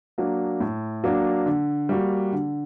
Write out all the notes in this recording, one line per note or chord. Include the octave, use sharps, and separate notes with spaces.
F#3 A#3 D4
A2
F#3 A#3 D4
D3
G3 A#3 F#4
D3